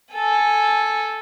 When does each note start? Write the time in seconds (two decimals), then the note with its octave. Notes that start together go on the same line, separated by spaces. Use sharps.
0.14 A4 G#5